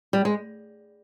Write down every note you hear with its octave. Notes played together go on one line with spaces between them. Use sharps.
G3
G#3